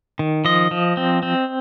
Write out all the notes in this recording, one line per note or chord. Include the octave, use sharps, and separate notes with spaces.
D#3
F3 D#5
F3
C4
C4